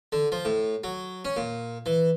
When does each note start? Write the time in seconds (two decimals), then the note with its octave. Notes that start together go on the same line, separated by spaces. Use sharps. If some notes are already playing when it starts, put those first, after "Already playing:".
0.12 D3
0.32 F3
0.45 A2
0.84 F#3
1.25 C#4
1.37 A#2
1.86 E3